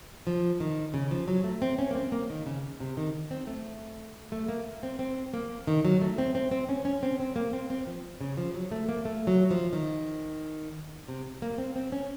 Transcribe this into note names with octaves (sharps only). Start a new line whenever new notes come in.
F3
D#3
C#3
F3
F#3
A3
C4
C#4
A#3
C4
A#3
D#3
C#3
C3
D#3
C4
A3
A3
A#3
C4
C4
A#3
D#3
F#3
A3
C4
C4
C4
C#4
C#4
C4
C4
A#3
C4
C4
F3
C#3
F3
F#3
A3
A#3
A3
F#3
F3
D#3
C3
A#3
C4
C4
C#4